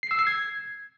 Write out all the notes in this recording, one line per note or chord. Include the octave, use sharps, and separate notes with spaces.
C7
E6
C7
G#6